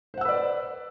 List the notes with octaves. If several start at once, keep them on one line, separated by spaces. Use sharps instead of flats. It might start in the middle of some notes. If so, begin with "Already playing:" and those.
B4 C5 D5 F#5 E6